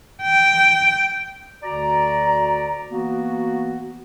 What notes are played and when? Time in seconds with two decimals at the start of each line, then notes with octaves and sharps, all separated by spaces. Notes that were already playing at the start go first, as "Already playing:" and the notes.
0.22 G5
1.63 D2 D3 F#4 D5 A#5
2.91 E3 A#3 B3 F#4